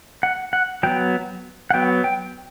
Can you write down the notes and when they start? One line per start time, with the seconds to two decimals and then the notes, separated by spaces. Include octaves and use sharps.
0.23 F#5
0.53 F#5
0.83 F#3 B3 G5
1.70 F#5
1.74 F#3 B3 G5
2.04 G5